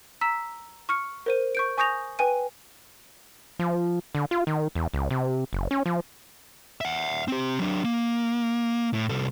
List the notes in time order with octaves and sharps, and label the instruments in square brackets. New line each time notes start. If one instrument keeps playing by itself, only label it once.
[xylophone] A#5 E6 B6 E7
C#6 F6 C#7
A#4 C5 D#7
C#6 G6 D7
G#5 C#6 D#6 G6 A#6 F7
B4 G5 G#5 D#7
[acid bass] F3
D3
F4
D#3
E2
C#2
C3
F#1
C#4
F3
[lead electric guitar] E5 F#5
C4 G4
F#3 D4
A#3
A2
C2 A4